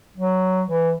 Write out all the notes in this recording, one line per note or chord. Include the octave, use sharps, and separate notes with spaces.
F#3
E3